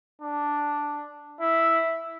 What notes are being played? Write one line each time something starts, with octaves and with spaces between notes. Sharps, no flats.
D4
E4